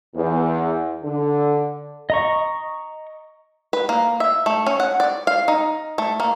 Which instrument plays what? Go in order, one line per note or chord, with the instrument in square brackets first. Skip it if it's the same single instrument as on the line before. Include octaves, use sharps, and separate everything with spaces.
[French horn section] E2
D3
[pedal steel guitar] D#5 A#5 C#6
[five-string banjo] B4
A#3
E5
A3
C#4
F#5
D5
F5
D#4
A3
A#3